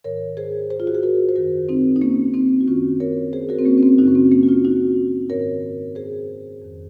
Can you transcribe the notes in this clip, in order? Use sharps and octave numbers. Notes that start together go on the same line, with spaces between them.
G#2 D#3 A#4 C#5
G#4 C5
G#4 C5
F4
F#4
G#4
F#4 A#4
C5
F#2 D#3 F#4 A#4
C4 D#4
D#4
A#3 C#4
C4 D#4
F#4
F#2 D#3 C#4 F4
A#4 C#5
G#4 C5
F#4 A#4
C4
A#3 C#4
C#4
C4
F#2 C#3 D#4 F#4
C#4
C4
A#3 C#4
F#4
C#4 F4
D#4 F#4
G#2 D#3 A#4 C#5
G#4 C5
F2 D#3